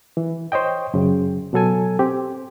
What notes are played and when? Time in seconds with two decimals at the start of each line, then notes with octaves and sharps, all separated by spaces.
0.17 E3
0.52 C5 C#5 D#5 G5
0.94 F#2 C#3
1.53 B2 F#3 A4 G#5
1.99 C4 G4